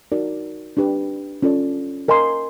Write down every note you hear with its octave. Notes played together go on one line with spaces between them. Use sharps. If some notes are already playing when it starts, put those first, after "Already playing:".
D#4 F#4 A#4 D5
D4 G4 B4
C#4 F4 A4 D5
A#4 D#5 G#5 C6